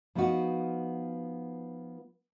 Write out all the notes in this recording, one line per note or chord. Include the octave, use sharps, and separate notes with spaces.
F3 B3 D#4 F4 F#4